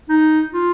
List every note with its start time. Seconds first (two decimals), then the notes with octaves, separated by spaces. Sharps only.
0.09 D#4
0.53 F4